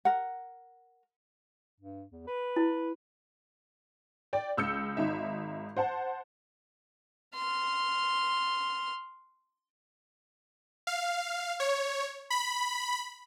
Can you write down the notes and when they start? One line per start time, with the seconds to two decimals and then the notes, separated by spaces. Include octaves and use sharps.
0.05 A#4 F#5
1.80 G2
2.12 E2
2.27 B4
2.56 E4
4.33 D5 G5
4.57 C#2 E6 G6 C#7
4.97 G#1 D#4 E5
5.76 C5 F#5 A5
7.34 C6 F6
10.87 F5
11.60 C#5
12.30 B5